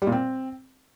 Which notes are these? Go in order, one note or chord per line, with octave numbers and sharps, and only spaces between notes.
G3
A#2
C4